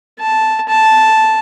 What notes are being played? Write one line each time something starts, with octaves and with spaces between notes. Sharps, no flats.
A5
A5